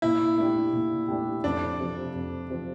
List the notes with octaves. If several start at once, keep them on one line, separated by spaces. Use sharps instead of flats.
A#2 E4
A3 D4 G4
A#2
A3 D4 G4
F2 D4
C3 F3
F2
C3 F3